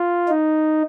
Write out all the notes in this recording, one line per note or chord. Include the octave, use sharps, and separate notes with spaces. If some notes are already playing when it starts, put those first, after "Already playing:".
Already playing: F4
D#4